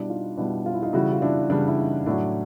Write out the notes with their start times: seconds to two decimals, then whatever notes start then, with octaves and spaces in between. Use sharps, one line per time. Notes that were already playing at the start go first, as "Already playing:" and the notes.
Already playing: B2 G3 D4 E4
0.09 D#4 F4
0.37 B2 G3 D4 E4
0.66 F4
0.74 E4
0.83 D#4 F4
0.93 C#3 E3 G3 E4 F#4
1.13 F4
1.22 D4 E4
1.50 C#3 E3 G3 D4
1.67 E4
1.78 D#4
2.06 A2 F#3 D4 E4